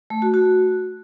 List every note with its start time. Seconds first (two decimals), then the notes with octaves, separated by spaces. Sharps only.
0.10 A3
0.22 F#4
0.34 F#4